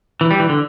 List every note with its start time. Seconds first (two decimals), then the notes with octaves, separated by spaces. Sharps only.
0.21 E3
0.31 G3
0.40 E3
0.49 D3